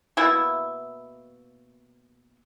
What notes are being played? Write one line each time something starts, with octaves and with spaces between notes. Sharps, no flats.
B2 A#3 E4 E5